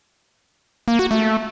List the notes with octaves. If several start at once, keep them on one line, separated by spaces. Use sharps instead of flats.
A#3
F#4
A3